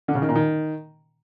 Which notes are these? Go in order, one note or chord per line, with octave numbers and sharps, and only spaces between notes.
D3
C#3
D#3
A#2
D#3